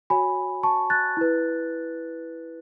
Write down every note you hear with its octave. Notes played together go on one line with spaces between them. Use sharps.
F#4 C#5 G#5 B5
A5 C#6
F#6 A6
E4 B4